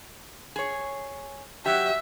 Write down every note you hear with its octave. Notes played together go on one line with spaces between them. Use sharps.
G#4 C#5
F#3 G4 E5